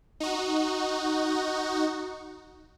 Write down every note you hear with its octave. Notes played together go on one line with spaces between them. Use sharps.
D#4 F#4